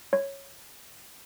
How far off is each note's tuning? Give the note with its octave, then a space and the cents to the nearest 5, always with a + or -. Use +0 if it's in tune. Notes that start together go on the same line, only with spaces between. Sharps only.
C#5 -5